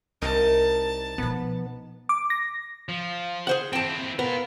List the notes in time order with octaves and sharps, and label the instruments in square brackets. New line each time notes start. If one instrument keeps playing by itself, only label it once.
[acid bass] C2 [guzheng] D#4 A#4 [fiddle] A5
[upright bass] B2 F3 [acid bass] B3
[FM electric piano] D6
A#6
[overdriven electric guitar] F3
[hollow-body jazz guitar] G#4 C5 F#5
[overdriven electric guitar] E3 C4 [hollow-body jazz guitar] G5 A5
[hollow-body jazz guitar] B3 [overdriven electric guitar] F4 A#4